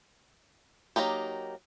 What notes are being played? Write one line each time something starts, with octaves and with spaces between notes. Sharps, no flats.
F#3 A#3 D#4 G4